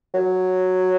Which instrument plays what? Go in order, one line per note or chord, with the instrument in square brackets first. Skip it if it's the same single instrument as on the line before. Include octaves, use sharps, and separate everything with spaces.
[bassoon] F#3